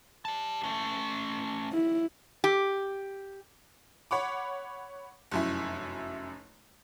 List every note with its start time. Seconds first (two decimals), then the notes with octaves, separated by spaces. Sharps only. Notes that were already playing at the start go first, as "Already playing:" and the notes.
0.25 G4 A5
0.63 A3 C#4
1.72 E4
2.44 G4
4.11 C#5 F#5 B5 D6
5.32 F1 F#2 E4